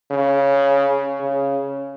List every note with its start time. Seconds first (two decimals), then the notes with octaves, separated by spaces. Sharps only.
0.11 C#3
1.20 C#3